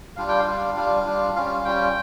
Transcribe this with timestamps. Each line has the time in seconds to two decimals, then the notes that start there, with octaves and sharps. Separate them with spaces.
0.16 G3 D4 F4 F5
0.29 G5
0.39 F5
0.47 G3 D4 F4
0.76 G3 D4 F4
1.05 G3 D4 F4
1.36 G3 C#4 F4 F5
1.65 G3 C#4 F4 G5